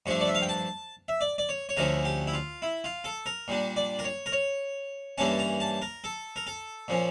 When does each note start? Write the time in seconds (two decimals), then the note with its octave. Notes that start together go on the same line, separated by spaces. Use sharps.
0.06 G2 F3 A3 D4 C#6
0.21 D5
0.28 E5
0.35 F5
0.42 G5
0.49 A5
1.08 E5
1.21 D5
1.38 D5
1.49 C#5
1.69 C#5
1.77 D2 D3 F3 A3 C#4 A#4
2.05 G4
2.27 E4
2.33 F4
2.62 E4
2.84 F4
3.04 A4
3.26 A#4
3.48 A#2 G3 D4
3.76 D5
3.99 A#4
4.04 C#5
4.26 A#4
4.32 C#5
5.18 G2 E3 G3 A#3 C#4 A5
5.39 A#5
5.60 A5
5.82 A#4
6.04 A4
6.36 A#4
6.47 A4
6.88 A#2 F3 C#4